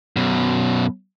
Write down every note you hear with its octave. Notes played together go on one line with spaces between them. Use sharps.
F#2 B2